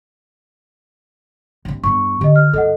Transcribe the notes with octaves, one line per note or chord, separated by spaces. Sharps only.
G2 C3
G2 B3 C#6
D3 G4 D#5
F6
G2 A4 D#5 F#5